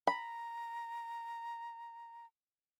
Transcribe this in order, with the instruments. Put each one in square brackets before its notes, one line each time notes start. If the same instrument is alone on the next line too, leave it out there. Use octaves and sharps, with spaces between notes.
[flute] A#5 [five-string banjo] B5